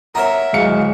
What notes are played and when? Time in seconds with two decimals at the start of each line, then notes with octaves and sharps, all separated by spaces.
0.15 F#4 A#4 C#5 E5 A#5
0.53 D1 G#3 F5 C#7